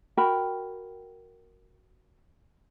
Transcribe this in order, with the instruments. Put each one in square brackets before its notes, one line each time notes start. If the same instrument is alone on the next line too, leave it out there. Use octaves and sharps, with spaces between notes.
[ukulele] F#4 A#4 G5 B5